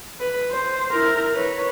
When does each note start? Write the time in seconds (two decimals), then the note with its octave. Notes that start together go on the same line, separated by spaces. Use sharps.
0.20 B4
0.51 C5
0.91 E4 A#4
1.34 B4 C#5